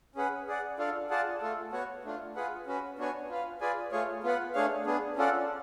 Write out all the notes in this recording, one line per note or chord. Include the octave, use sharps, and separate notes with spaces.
C#4 G#4 B4 F#5
G#4 D5 F#5
D4 F4 A4 D5 F5
F4 G#4 D5 F#5 A5
A3 F4 A4
B3 F#4 C#5 F#5
A3 D4 F4
F4 G#4 B4 F#5
C#4 F#4 B4
B3 D4 F#4 C#5 G#5
F4 B4 F5
F4 G#4 B4 D5 G#5
A3 F4 G#4 C#5
B3 F4 B4 F#5
A3 D4 G#4 C#5 F5
B3 D4 G#4
C#4 F4 A4 D5 F#5